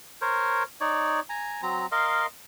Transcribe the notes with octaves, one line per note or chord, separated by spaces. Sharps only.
A#4 C5 C#5
D#4 C#5 D5
G#5 A#5
F#3 C4 A#5
A#4 D#5 F5 C6